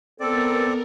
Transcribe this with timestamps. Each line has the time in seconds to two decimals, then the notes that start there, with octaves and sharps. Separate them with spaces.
0.20 B3 C4 A4 A#4 D5